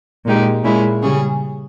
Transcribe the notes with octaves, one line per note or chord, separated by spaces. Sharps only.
A#2 G#3 D#4 G4
A#2 G#3 C#4 E4
C#3 G3 C#4 G#4